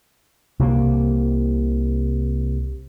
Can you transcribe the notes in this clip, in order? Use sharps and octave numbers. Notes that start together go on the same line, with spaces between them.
C2 C3 F#3 A#3